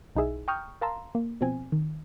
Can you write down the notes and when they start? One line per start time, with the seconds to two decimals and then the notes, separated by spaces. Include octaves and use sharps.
0.16 B1 D#4 E4 G#4 E5
0.48 G5 A#5 C#6 D#6 F6 G6
0.81 A#4 F5 A5 A#5 C6 E6
1.15 A#3
1.41 B2 F3 C4 G#5
1.72 D#3